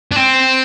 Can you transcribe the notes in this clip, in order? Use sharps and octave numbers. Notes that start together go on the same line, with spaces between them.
D4
C4